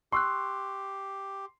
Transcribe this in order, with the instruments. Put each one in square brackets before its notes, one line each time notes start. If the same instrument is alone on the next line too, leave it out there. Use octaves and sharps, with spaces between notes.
[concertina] G4 [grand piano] C6 [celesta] C#6 E6 F#6